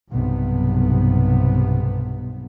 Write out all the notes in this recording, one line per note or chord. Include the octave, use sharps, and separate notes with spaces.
B1 G2 C3 B3